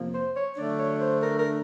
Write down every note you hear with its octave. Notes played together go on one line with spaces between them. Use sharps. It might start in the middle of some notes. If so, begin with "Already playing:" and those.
Already playing: F2 C3 F3 A#3
C5
C#5
D3 F#3 A3 D4 D5
C#5
C5
A#4
A#4